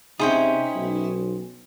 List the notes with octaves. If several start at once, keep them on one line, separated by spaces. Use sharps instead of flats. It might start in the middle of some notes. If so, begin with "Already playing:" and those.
C3 C#4 D#4 E4 G#4 C5 G5
B1